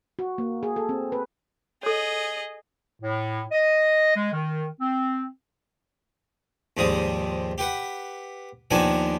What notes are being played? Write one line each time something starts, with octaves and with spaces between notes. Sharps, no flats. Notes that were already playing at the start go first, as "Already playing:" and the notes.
F#4
A#3
G#4
A4
C4
B4
G#4 A4 C#5 D#5
A2
D#5
G#3
D#3
C4
D#2 G#2 F3 G3 D#6
G4 B4 F#5
D#2 D#3 F3 B3 D4 G#5